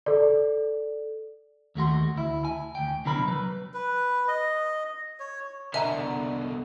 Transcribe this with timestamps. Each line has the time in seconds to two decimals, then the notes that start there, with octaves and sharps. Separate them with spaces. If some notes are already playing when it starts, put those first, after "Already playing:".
0.06 A4 D5
1.75 D#2 A3 F#4 C6
2.15 D2 E4
2.45 G#5
2.75 D2 G5
3.05 C2 B2 D3 F#3 A#4 B5
3.28 F#3 B4
3.74 B4
4.28 D#5
5.20 C#5
5.74 C2 B2 D3 D#5 E5 G#5 A#5